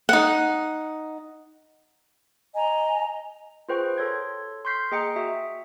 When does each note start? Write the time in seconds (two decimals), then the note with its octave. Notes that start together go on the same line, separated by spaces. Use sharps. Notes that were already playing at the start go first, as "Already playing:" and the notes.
0.09 D#4 F#5
2.54 D#5 G#5 A#5
3.69 F4 G#4 B4 C5 G5 C#6
3.98 A4 C#5 C6 G#6
4.65 C6 C#6 F6 G6 B6 C7
4.91 A#3 G#4 D#5 G5 A#5 C#7
5.16 F#4 E5